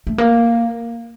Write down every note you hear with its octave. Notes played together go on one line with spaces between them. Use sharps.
A3
A#3